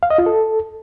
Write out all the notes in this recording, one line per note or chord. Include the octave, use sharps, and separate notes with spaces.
F5
D#5
F4
A4